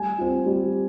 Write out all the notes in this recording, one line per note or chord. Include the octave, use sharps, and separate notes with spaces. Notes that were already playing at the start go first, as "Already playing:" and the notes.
Already playing: G3 G#5
C4 F4
G3